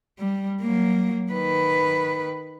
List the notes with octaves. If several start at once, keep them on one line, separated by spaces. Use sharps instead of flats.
G3
F#3 A#3
D#3 B4